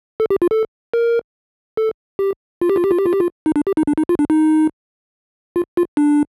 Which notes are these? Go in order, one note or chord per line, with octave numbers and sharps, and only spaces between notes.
A4
G4
F4
A4
A#4
A4
G4
F4
G4
F4
G4
F4
G4
F4
G4
F4
D#4
D4
G4
D#4
D4
D#4
F4
D4
D#4
F4
F4
D4